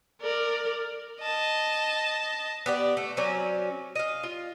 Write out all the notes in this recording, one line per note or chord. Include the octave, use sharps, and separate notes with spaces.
A#4 D5
D#5 A5
B3 G4 D5
A3
F#3 C4 C#4 D5
D#5 F5
F4